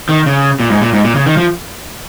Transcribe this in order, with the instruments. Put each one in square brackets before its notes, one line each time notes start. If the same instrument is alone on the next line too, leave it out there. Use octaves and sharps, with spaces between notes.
[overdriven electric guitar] D#3
C#3
A#2
G#2
A#2
G#2
A#2
C#3
D#3
F3